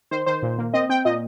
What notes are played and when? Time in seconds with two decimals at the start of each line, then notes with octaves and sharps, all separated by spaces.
0.11 D#3 C5
0.26 D#3 C5
0.43 A#2
0.58 A#3
0.74 C4 D#5
0.89 C4 G5
1.05 A#2 D#5